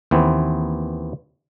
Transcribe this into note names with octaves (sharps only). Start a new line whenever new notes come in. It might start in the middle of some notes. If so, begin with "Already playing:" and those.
D#2 E3 B3 C4